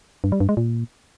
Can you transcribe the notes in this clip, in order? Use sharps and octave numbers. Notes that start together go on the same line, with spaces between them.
G2
G3
G2
G#3
A#2